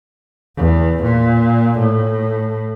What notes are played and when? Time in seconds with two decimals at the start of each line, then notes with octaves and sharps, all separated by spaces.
0.57 E2
1.02 A#2
1.78 A2